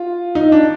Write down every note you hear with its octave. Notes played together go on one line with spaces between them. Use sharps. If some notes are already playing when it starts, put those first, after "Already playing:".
Already playing: F4
D#4
D4